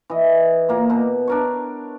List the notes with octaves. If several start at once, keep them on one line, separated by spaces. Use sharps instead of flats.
E3 D#5
A#2 A#3 A#5
B2
D4 A#4 C#5